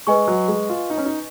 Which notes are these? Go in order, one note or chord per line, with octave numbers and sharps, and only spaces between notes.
G#3 B4 D#5 G#5 C#6
F#3
G#3
F4
D#4
C#4
D#4